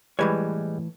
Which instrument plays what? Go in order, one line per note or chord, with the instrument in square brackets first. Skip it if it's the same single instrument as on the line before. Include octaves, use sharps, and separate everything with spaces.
[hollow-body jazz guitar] A2 E3 C#5 [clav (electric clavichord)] G3 G#3 B4